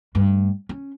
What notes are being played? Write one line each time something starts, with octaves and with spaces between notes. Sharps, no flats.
G2 A3
C#4